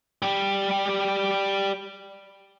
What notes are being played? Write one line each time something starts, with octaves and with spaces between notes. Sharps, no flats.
G3 G4